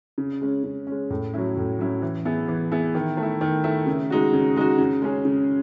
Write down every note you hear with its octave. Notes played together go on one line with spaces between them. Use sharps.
C#3
G#3 C#4
C#3
G#3 C#4
A2
F#3 C#4 E4
A2
F#3 C#4 E4
E3
B3 E4 G#4
E3
B3 E4 G#4
D#3
A3
E4
D#3
A3 E4
C#3
G#3 D#4 F#4
C#3
G#3 D#4 F#4
C#3
G#3 C#4 G#4
C#3